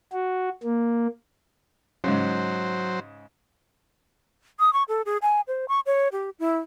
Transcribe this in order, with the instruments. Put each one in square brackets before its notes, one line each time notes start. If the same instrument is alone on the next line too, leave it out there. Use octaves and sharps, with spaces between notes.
[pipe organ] F#4
A#3
[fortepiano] G#2 C#3 [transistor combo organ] F#3 C5
[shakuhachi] D#6
C#6
A4
G#4
G#5
C5
C#6
C#5
G4
E4